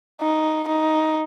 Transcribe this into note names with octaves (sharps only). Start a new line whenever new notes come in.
D#4
D#4